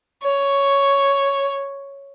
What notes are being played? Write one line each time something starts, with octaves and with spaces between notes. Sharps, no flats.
C#5